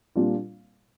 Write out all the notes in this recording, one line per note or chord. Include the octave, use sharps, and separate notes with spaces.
A#2 G3 D4 F4